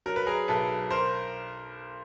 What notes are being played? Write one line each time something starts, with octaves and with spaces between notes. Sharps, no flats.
F#3 A#4
B4
G#4 A#4
B1 A4 B4
A#4 C5